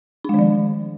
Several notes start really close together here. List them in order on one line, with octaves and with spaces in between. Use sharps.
D4 G#3 D#3 F3